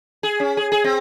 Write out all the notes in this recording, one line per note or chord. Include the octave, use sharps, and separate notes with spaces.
G#4
C#4
G#4
G#4
C4